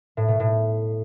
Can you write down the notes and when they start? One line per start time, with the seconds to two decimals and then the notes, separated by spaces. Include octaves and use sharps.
0.17 A2
0.28 B2
0.40 A2